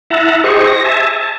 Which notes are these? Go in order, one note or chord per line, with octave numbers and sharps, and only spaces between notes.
E4 E5 F#5 A5 A#5
G4 G#4 C5 D#5 C#6
A#6
E5 G#5 A5
A5